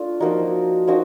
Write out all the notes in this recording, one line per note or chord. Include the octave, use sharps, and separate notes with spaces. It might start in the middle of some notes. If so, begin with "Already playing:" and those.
Already playing: A3 D4 F4
F3 A#3 D#4 F#4
F3 A#3 D#4 F#4